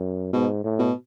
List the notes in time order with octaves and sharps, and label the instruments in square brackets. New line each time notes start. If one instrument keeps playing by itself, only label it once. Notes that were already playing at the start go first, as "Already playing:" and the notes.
Already playing: [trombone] F#2
[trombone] G#2 [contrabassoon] B2
[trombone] A2
[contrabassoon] B2